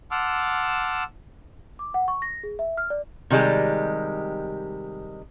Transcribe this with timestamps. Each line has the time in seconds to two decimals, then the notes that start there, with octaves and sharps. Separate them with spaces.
0.11 F#5 A5 C6 D6 E6 F6
1.79 D6
1.94 F#5
2.08 C#6
2.22 A#6
2.43 G#4
2.59 E5
2.77 F6
2.90 D5
3.30 C3 D#3 G3 G#3